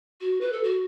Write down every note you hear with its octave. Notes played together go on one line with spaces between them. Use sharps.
F#4
B4
A4
F#4